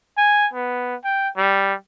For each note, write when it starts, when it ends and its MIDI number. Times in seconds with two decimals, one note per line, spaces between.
0.17 0.47 80
0.53 0.95 59
1.04 1.29 79
1.37 1.74 55